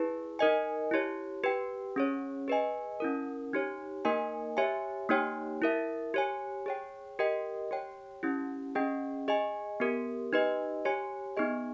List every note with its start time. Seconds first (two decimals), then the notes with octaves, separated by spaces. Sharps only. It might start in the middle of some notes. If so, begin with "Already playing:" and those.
Already playing: E4 G#4 B4
0.39 D#4 A#4 D#5 G#5
0.91 E4 G4 C#5
1.44 G4 B4 G5
1.96 C#4 G#4 C#5
2.48 G#4 B4 D#5 G#5
3.00 C#4 E4 A#4
3.53 D#4 G4 C#5
4.05 A#3 D#4 A#4 D#5 G#5
4.57 G4 C#5 E5 G#5
5.09 A#3 D#4 G4 C#5 G5
5.62 E4 A#4 E5
6.14 G4 C#5 G#5
6.66 G#4 C#5 G5
7.19 G4 A#4 D#5 G5
7.71 G4 C#5 G5
8.23 C#4 E4 G4
8.75 C#4 G#4 D#5 G5
9.28 G#4 D#5 G#5
9.80 B3 G4 A#4
10.33 D#4 G4 B4 D#5
10.85 G4 C#5 G#5
11.37 B3 D#4 G#4 D#5